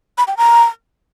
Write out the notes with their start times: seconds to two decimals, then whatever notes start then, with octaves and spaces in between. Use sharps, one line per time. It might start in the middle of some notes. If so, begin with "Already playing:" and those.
0.18 B5
0.28 G5
0.37 A#5